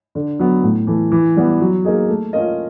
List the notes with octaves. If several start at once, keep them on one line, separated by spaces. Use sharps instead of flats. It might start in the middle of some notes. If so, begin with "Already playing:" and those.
D3
F#3 B3
A2
E3 A3
E3
G3 B3
F#3
A#3 D#4 G#4
A3
C#4 F4 A#4 D#5